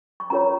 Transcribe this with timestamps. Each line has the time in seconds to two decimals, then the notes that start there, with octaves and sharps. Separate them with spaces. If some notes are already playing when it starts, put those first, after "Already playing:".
0.20 C#6
0.30 C#4 F4 A#4 C#5 A#5